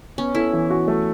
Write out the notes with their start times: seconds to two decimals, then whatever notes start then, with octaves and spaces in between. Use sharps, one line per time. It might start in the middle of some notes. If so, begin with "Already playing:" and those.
0.18 B3 C#4
0.35 E4 A4
0.53 E3
0.70 F#4
0.88 A3